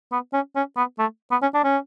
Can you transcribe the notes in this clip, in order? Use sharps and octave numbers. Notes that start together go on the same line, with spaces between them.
B3
C#4
C#4
B3
A3
B3
C#4
D4
C#4